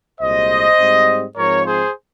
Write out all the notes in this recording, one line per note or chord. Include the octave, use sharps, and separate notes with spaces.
C2 A#2 G#3 C5 D#5
G#2 G3 C4
G#2 F3 C4 A#4 C#5
G#4 C5